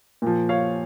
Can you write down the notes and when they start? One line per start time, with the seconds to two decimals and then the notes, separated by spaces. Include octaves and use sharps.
0.22 A#2 F3
0.49 C#5 F5